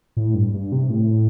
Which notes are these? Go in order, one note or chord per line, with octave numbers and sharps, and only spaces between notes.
A2
G2
G2
C3
A2